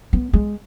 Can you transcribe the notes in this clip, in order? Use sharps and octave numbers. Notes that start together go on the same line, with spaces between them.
B3
G#3